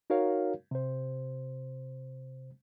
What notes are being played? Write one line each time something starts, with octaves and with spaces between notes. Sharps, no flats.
D#4 F#4 A#4 C#5 F5
C3 C5